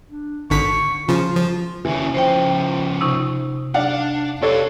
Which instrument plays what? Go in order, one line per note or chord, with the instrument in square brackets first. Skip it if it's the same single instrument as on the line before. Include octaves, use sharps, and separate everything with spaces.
[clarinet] D4
[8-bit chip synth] G#1 D3 B6 [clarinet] C#6
[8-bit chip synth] C#3 F3 [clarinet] F4
[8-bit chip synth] F3
[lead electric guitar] D#2 C#3 [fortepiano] E3
[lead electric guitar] C#3 F3 [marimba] C5 G5
[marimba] C3 D#4 C#6
[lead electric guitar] D4 [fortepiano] D5 F5 F#5
[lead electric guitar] G4 F5 [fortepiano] A4 C#5 D5